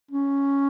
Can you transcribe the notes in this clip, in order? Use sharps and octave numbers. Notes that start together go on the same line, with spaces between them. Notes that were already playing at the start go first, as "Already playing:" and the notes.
C#4